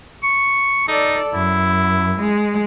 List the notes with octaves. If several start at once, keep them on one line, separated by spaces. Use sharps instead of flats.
C#6
D#4 A4 D5
F#2 E4
G#3